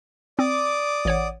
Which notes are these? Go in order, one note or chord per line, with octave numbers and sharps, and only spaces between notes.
C4 D5 D6 D#6
A1 C#5 F#5